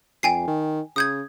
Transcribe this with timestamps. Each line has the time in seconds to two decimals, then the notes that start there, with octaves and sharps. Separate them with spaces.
0.23 F2 G5 G#5 C7
0.48 D#3
0.96 C#3 D#6 G6 G#6